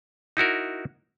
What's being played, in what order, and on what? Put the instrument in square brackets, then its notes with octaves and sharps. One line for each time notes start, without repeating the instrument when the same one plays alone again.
[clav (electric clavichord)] D#4 E4 F#4 A#4